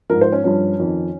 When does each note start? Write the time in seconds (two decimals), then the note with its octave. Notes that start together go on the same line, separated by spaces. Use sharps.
0.09 G#2 F3 A#4
0.21 C5
0.32 C#4
0.44 G2 F3 C#4
0.79 F2 D#3